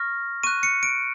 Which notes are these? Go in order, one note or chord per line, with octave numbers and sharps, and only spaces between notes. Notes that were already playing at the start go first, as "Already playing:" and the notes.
Already playing: C#6 F6 A#6
C#6 F#6 D#7
C#7
D7